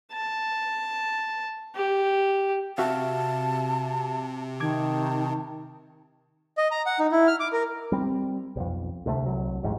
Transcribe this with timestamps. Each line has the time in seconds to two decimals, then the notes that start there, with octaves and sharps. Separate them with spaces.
0.12 A5
1.75 G4
2.78 C3 F#4 E5 F5 A5
4.60 D#3 A5 D6 G#6
6.57 D#5
6.71 A#5
6.86 F#5
6.99 D#4
7.12 E4
7.27 F6
7.40 D6
7.53 A#4
7.92 G3 C4
8.56 B1 F2
9.06 D2 C3 A3
9.26 C2 F#3
9.63 D#1 A1 G#2